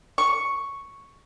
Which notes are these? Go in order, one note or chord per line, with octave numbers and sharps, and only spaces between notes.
C#6